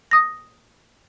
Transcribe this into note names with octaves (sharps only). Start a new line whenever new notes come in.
D#6 A#6